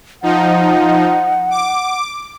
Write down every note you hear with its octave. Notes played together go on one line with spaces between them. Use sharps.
F3 D#4 F#5
D6